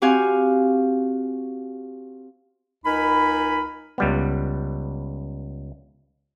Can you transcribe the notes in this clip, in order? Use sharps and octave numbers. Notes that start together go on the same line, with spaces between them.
C4 F#4 G4 F5 G#5
C#2 D#4 A#4 G#5 B5
C#2 G3 B3